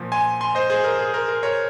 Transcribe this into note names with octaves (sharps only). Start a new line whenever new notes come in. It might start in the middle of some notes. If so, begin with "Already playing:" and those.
Already playing: A#2 F3
G#5 C6
G#5 C6
C5 D#5
G#4 C5
A#4
G#4
A#4
A#4
A#4 C#5